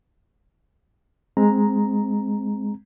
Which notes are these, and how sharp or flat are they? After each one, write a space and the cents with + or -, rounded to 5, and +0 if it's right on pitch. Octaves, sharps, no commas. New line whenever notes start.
G#3 +0 C4 +0 A#5 +0